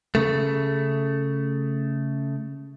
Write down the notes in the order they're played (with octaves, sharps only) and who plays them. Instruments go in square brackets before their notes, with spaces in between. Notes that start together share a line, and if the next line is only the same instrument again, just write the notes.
[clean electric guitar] C#3 A3